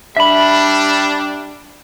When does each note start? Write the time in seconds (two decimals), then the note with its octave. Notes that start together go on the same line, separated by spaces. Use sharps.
0.17 G3 D4 E5 B5